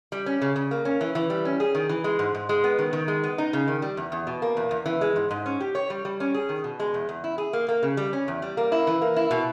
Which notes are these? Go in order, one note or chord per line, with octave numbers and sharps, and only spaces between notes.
G3
C#4
C#3
C#3
A#3
C#4
E3
E3
G3
C#4
G#4
D#3
E3
G#3
G#2
G#2
G#3
B3
D#3
D#3
G#3
B3
D#4
C#3
D#3
G3
E2
E2
B2
A#3
E2
E2
E3
G#3
G#2
G#2
C#4
G4
C#5
G3
G3
C#4
G#4
D#3
B2
G#3
E2
E2
E4
G#4
A#3
A#3
C#3
G3
C#4
E2
G3
A#3
E4
E3
A#3
E4
B2